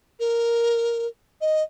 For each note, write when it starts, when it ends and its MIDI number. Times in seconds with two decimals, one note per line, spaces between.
0.19 1.06 70
1.41 1.63 75